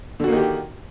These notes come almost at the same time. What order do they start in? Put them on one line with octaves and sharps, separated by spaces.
D3 F#4 A#3 D#3 G4